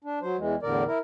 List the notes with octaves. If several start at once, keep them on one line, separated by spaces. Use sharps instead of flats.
D4
F#3 C5
E2 E3 G#3
E2 A2 D3 A#4 D5
E4 A#4